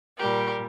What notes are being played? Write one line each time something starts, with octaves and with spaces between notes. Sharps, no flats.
A#2 G3 G4 A#4